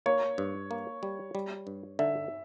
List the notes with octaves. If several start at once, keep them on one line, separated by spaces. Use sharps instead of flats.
A#3 C#5
G2
A#3
G3
G3
G2
D3 E5